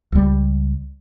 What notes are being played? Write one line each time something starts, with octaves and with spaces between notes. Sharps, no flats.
C#2 G3